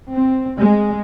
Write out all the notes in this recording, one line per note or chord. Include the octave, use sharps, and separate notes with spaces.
C4
G#3